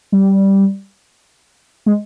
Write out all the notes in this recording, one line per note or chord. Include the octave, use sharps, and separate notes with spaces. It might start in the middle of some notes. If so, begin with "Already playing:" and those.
G3
G#3